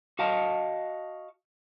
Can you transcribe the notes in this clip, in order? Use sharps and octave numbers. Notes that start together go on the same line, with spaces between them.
F#4 D#5 F5 A5